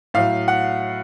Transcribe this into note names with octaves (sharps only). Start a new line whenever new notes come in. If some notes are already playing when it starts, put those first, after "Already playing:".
A2 F#3 F5
F#5